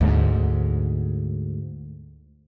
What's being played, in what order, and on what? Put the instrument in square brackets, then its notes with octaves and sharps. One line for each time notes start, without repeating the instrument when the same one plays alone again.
[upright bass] D2 G#2